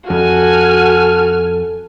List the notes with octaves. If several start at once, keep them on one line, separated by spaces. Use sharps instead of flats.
F2 F#4 A4 G#5 F6